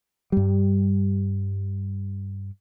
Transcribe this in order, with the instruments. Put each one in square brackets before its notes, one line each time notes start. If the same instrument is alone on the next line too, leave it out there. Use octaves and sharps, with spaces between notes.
[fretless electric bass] G2 G3